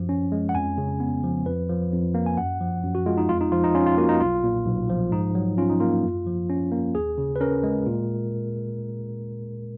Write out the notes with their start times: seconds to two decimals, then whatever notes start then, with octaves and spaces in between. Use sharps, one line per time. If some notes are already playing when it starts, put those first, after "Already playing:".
Already playing: F#2 F3
0.09 C#4
0.32 G#3
0.49 F#5
0.55 F2 G#5
0.78 C#3
1.00 B3
1.24 F3
1.46 F2 B4
1.69 F3
1.92 F2
2.15 A#3
2.26 G#5
2.38 F#2 F#5
2.61 F3
2.83 F#2
2.95 F#4
3.06 G#3 F4
3.18 D#4
3.29 F2 F4
3.41 D#4
3.52 F3 F4
3.63 D#4
3.75 C#4 F4
3.86 F4
3.98 A#3 F#4
4.09 D#4
4.20 B1 F4
4.43 A#2
4.66 B1
4.89 F3
5.12 G#2 D#4
5.35 F#3
5.58 C#4 F4
5.70 D#4
5.80 A#3 F4
6.03 F#2
6.27 F3
6.49 C#4
6.72 A#3
6.95 D#2 G#4
7.18 C#3
7.36 B4
7.41 C#4 A#4
7.63 G#3
7.86 A#2